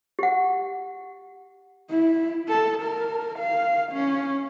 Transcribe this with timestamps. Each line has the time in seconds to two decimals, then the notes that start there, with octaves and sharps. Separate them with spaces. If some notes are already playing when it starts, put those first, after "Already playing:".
0.19 G4 F#5
1.90 E4
2.48 A4
2.83 A#4
3.39 F5
3.93 C#4